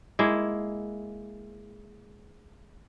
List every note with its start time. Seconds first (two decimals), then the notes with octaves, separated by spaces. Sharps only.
0.19 G#3 A#3 E4